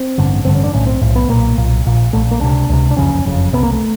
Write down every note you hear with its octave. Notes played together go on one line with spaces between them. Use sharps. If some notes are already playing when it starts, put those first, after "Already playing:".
Already playing: C4
A1 G2 D3
A1 G2 D3 C4
C#4
D4
B1 A2 C#4
C4
B1 A2
B3
B1 A#2 A#3
B1 A#2
A#1 A#2
A#1 A#2 A3
A#3
C#2 C3 D4
C#2 C3
D4
F#1 F2 C#3 C#4
F#1 F2 C#3
C2 C3 B3
A#3
A3